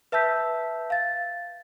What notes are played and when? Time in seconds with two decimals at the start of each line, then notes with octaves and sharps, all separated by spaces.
0.12 B4 E5 A5 E6 G6 B6
0.90 F5 A6